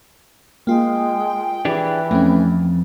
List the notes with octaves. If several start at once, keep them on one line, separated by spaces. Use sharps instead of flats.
G#3 A#3 F4 G5
E3 D4 G4 G#4
F2 A3 C4 C#4